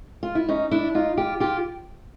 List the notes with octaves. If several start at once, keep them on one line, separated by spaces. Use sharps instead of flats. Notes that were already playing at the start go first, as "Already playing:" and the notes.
F4
E4
C#4 D#4
D4 E4
D#4 F4
F4 G4
F4 G4